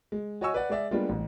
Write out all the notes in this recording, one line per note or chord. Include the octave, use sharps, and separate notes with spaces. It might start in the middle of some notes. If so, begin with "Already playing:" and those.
G#3
F#4 C#5 D#5 G#5 C#6 E6
B4 D5 F#5
G#3 G#4 D5 E5
G3 G#3 A#3 B3 D4 F4
A1